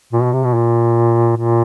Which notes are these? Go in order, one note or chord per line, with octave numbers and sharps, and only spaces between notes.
A#2
B2
C3
B2
A#2
A#2